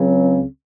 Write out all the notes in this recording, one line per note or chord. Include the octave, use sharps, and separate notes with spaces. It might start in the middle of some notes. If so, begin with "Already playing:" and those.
Already playing: C#2 C#3 F#3 C4